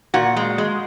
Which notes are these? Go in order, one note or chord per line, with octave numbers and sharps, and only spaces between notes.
A#2 F#4
G#3
G#3